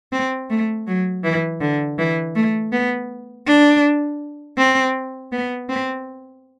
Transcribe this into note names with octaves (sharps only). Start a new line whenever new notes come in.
C4
A3
F#3
E3
D3
E3
A3
B3
D4
C4
B3
C4